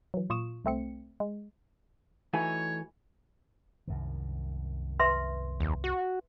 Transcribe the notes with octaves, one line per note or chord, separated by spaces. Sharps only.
E3 F#3
A#2 F4 C#6 D#6 E7
C2 A3 C4 C#7
G#3
E3 A3 D#4 F#4 C#5 G#5
C2 F#2 D#3
B4 E5 C6
D#2
F#4